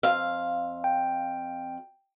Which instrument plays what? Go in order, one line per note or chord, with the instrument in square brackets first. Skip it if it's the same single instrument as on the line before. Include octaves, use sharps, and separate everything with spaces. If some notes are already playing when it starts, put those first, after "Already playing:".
[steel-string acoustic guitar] F2 F5
[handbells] G5